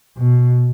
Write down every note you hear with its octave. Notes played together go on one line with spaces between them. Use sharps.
B2